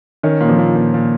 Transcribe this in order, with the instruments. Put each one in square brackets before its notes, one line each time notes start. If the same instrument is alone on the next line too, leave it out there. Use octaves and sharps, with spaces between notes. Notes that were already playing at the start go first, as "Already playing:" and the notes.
[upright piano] D#3 [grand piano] C#4
[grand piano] A#2
[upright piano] F3
[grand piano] A#2
A#2
A#2